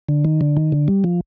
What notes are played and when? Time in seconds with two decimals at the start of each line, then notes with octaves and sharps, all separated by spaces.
0.09 D3
0.25 D#3
0.41 D3
0.57 D#3
0.72 D3
0.88 G3
1.04 F3